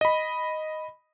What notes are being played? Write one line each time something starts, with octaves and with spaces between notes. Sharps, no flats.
D#5 B5